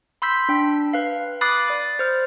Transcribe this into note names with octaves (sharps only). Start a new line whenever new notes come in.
B5 C6 E6 G6 B6
D4 G5
B4 F5
B5 D6 D#6 F#6 A6 C7
D5 A6
C5 F6